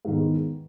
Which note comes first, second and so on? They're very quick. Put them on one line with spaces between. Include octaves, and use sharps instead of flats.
G#2 D#3 E2